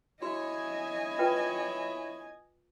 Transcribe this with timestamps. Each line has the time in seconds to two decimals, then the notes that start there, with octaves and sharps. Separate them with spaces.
0.22 E4 F#4 C#5 D#5 G#5
1.19 F4 B4 G5